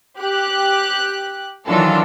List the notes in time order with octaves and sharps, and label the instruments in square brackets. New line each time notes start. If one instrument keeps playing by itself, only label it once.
[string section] G4 F#6
D#3 E3 F#3 D4 F4 A4